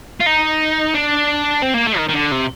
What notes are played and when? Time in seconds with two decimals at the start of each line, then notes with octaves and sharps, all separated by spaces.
0.21 F4
0.27 D#4
0.95 D4
1.63 C4
1.74 A#3
1.87 A3
1.98 D#3
2.09 D#3
2.14 D3
2.32 C3